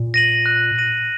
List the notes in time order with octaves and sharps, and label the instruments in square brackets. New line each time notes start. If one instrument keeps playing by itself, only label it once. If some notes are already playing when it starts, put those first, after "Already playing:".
Already playing: [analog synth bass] A#2
[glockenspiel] A#6 D#7 F#7
F#6
A#6 D#7 F#7